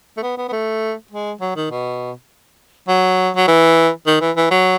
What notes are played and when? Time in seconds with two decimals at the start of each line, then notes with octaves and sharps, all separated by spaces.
0.17 A3
0.23 B3
0.38 B3
0.49 B3
0.52 A3
1.11 G#3
1.41 F#3
1.56 D#3
1.71 B2
2.88 F#3
3.36 F#3
3.48 E3
4.07 D#3
4.21 E3
4.37 E3
4.51 F#3